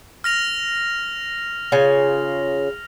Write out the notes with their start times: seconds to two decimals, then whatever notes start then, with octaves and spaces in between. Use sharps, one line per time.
0.24 F6 A#6 F7
1.72 C#3 F4 G#5